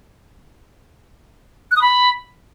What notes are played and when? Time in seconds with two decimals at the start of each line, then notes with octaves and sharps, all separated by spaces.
1.71 F#6
1.76 D#6
1.81 B5